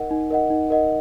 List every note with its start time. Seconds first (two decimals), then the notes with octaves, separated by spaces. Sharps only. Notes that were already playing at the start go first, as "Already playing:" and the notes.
Already playing: D#4 A#4 D#5 F#5
0.11 D#4
0.31 A#4 D#5 F#5
0.50 D#4
0.70 A#4 D#5 F#5